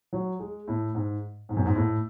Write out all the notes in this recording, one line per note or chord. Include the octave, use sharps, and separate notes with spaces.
F#3
G#3
A2
G#2
G#2
F#2
G#2
A2